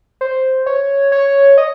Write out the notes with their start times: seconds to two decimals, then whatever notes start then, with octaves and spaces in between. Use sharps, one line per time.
0.21 C5
0.66 C#5
1.12 C#5
1.58 D#5